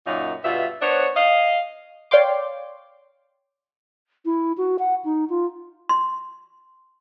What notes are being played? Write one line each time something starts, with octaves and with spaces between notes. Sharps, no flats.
F#2 A#2 F#3 D#4 F#4
G2 B2 F4 E5
B3 D4 C5 C#5
D#5 F5
C#5 D5 F5 G5 C6 D6
E4
F#4
F#5
D#4
F4
C6